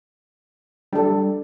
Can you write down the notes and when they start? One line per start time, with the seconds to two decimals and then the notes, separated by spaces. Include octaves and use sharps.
0.93 G3 D4 A4